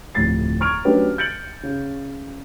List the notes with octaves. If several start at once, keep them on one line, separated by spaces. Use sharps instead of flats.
D1 F2 A2 G4 A6 C7
A#5 C#6 F6 G#6 D7 F7
F#3 A3 C#4 D4 G4 B4
G6 A6 C#7 D7 F#7
C#3